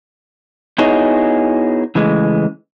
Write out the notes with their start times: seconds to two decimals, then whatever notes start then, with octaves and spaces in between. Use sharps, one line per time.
0.78 B3 D#4 E4 F#4 G#4 C#5
1.95 C#3 E3 G#3 A3